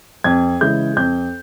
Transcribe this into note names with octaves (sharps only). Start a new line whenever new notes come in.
F2 G#6
C#3 E3 G#3 G6
F2 G6